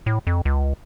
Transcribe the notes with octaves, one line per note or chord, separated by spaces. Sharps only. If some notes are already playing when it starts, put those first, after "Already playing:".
A2
F2
C#2